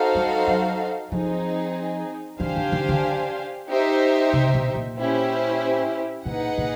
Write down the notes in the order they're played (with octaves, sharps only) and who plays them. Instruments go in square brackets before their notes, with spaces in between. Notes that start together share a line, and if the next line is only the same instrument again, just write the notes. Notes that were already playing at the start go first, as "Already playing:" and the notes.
Already playing: [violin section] D#4 F#4 A4 C5 F5
[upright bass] G3
F#3
[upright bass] F3 [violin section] C4 D#4 G#4
[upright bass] E3 [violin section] D4 G4 C5 F5 G#5
[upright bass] D#3
D#3
D3
[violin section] D#4 G4 C5 E5
[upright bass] C3
B2
A#2
[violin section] C#4 E4 G4 C5
[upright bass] A#2 [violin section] D#4 G#4 B4 D#5 F#5
[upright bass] A#2